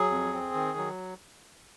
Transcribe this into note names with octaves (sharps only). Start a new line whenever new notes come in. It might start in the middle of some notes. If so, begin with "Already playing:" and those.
Already playing: F#3 G#4
F2
C4
D#3
F#3